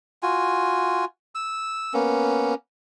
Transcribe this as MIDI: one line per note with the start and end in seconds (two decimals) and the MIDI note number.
0.23 1.05 65
0.23 1.05 66
0.23 1.05 80
1.35 1.93 88
1.94 2.54 58
1.94 2.54 59
1.94 2.54 61